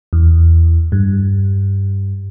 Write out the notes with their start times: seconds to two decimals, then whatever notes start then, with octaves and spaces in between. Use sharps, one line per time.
0.13 E2
0.92 G2